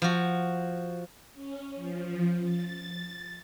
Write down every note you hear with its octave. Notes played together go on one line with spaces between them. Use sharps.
F3 F#4
C#4
F3
A6